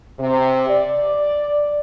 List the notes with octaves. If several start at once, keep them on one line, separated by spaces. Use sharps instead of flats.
C3
D5